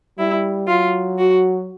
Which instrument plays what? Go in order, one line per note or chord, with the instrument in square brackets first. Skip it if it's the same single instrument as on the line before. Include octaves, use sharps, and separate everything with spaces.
[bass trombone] G3 [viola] E4
[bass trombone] F#3 [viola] F4
[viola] F#4